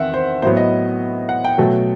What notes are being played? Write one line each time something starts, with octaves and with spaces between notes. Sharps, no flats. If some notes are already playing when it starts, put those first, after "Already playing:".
Already playing: E2 D#3 C4 E5 F#5
C5
A2 F#3 B3 C5
D#5
F#5
G5
B2 F#3 A3